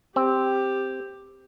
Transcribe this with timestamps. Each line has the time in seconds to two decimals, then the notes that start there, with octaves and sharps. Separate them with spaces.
0.16 C4 G4